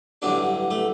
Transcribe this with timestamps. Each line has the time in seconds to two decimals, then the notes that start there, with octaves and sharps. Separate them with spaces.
0.22 A1 G2 D3 F#3 D4
0.70 A3